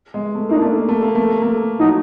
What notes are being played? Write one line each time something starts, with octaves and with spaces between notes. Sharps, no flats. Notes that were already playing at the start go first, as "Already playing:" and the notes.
G#3
A3
A#3 D#4
D4
A3
A#3
A3
A#3
A3
A#3
A3
F#3 D#4